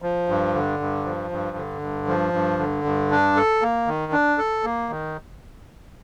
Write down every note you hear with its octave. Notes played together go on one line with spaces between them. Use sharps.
F3
G2
D3
G2
F3
G2
D3
G2
F3
G2
D3
G2
D4
A4
A#3
D#3
D4
A4
A#3
D#3